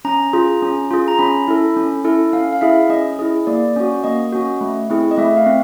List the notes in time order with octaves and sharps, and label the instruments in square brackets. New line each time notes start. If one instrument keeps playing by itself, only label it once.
[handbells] C#4 A#5
F4 G#4
C#4
F4 G#4
A#5
C#4 B5
E4 A4
C#4
E4 A4
C#4 F5
F5
E4 G#4 E5
C#4 D#5
E4 G#4
A#3 D5
C#4 F#4
A#3 D#5
C#4 F#4
A3
C4 E4 G#4
D#5
A3 E5
F5
C4